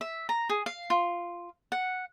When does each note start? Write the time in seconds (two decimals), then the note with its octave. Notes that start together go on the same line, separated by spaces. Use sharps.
0.01 E5
0.29 A#5
0.49 G#4
0.66 F5
0.90 F4
1.72 F#5